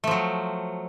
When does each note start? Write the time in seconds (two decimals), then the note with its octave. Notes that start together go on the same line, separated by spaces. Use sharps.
0.04 A3
0.07 F3
0.11 F#3